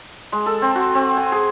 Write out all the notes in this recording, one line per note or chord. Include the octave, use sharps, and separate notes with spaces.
G#3
A4
C4
F#4
C4
G#5
G#4